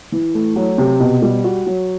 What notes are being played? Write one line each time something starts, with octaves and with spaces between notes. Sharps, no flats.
E3
A3
F#3
C3
B2
G3
F#4
F#3